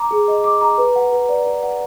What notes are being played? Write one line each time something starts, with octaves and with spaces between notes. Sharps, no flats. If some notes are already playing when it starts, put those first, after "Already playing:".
Already playing: A#5 D6
G#4
D#5
D6
A#5
B4
F#5
B4
D5
B4
F#5